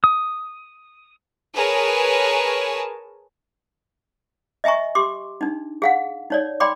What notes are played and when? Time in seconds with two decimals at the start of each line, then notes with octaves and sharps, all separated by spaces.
0.04 D#6
1.55 G#4 A#4 B4 C#5 G#5 A5
4.64 D#5 E5 G#5 A#5 C#6
4.95 G4 C6 D6
5.41 D4 D#4
5.82 G#4 F5 F#5
6.30 D#4 C#5 D5
6.60 D5 G5 B5 C6 D6